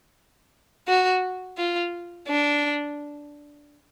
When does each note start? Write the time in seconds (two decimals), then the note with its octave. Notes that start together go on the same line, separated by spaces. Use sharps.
0.88 F#4
1.58 F4
2.28 D4